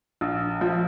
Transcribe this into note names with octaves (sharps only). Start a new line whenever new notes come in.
A#1
F3